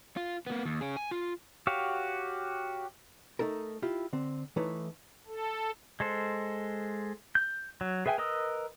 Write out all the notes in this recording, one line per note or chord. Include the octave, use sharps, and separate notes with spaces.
F4
A#3 B3
D#2
C#4 G#4
G#5
F4
F#4 G4 C#5 F5
A3 D#4 A4 A#4
E4 F4 G4
D3 C4
E3 A3 D#4 E4 B4 C#5
A4
G#3 A4 C5
G6
F#3
G#4 B4 E5 G5 G#5
A#4 B4 D#5 D#6 E6